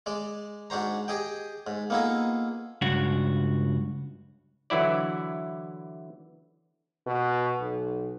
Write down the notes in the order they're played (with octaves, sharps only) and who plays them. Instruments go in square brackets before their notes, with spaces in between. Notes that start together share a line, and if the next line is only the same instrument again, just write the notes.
[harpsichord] G#3 D5
G#2 D4 F#4 C5 A#5
G4 G#4 D#5 G5
G#2
A#3 B3 D#4 F4 G#4 A4
[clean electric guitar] C#2 G2 F#4
[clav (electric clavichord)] D3 E3 F#3 E4 D5
[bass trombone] B2
B1